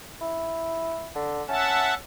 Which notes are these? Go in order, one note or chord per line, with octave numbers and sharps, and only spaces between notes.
E4
D3
C#4 E5 F#5 A5